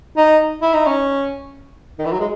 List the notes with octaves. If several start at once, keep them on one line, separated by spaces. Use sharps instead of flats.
D#4
E4
D#4
C#4
D#3
E3
F#3
G#3